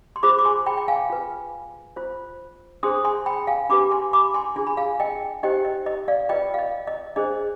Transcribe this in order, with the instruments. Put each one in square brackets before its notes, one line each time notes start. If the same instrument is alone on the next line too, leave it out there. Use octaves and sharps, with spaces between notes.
[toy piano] C6
F4 G#4 C5 B5 D6
D6
G#5 C6
G5 B5
G5
F5 G#5
F4 B4
F4 C5
D4 G#4 C5 C6 D#6
G#5 C6
G5 B5
F5 G#5
D4 G4 B4 B5 D6
G#5 C6
B5 D6
G#5 C6
D4 F4 G#4 G#5
B5
F5 G#5
D#5 G5
D#4 G4 C5 D#5 G5
D#5
D#5
D5 F5
F4 B4 D#5 G5
F5
D#5
D#5
D4 G#4 C5 D#5